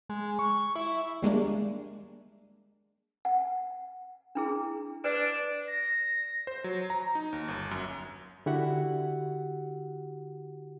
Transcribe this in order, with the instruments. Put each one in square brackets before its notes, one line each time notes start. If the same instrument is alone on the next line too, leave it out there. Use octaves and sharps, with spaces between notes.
[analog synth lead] G#3
C#6
C#6
E4
[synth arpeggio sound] G3 G#3 A#3 D4
[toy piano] F#5
D4 E4 G#4
[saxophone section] D4 [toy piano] B4 D5
[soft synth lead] A#6
[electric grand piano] C5
F#3
A#5
D#4
D#2
G1
F#2
[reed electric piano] D3 E4 F#4 G4 E5 F#5